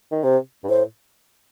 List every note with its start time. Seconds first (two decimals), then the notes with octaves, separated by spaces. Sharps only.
0.12 D#3
0.24 C3 C5
0.64 G2
0.69 A2 C5